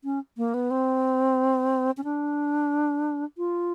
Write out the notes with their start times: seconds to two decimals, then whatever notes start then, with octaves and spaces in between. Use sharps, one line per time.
0.04 C#4
0.37 A#3
0.54 B3
0.71 C4
1.97 C#4
2.04 D4
3.38 F4